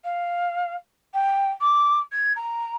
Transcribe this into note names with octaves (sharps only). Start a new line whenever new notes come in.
F5
G5
D6
G#6
A#5